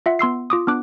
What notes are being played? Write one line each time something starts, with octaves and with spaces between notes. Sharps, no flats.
F4 E5 F#5
B3 C6 E6 C7
F4 D6 D#6
B3 D4 D6 F#6